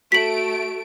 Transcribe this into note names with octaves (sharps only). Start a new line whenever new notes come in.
A3 F#4 B6 D7 F#7